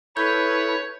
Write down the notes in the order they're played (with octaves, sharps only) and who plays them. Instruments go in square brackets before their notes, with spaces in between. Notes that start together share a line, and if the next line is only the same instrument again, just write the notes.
[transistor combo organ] E4 A4 [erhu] B4 [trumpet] C#5 [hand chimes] G6